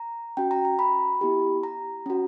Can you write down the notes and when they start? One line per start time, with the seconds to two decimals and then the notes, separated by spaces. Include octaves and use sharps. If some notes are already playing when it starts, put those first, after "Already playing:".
Already playing: A#5
0.37 C#4 F#4 G5
0.51 A#5
0.65 A#5
0.79 B5
1.21 B3 E4 G4
1.63 A#5
2.06 C#4 F#4